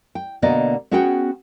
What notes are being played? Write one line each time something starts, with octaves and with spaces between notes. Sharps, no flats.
G5
B2 D3 A#3 B3 D5 D#5
B3 C#4 F#4 G#4 F#5 G5